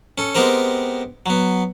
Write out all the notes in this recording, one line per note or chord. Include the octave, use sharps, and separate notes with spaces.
C#4 A4
G#3 B3 C4 G4 A#4 C5
F#3 B3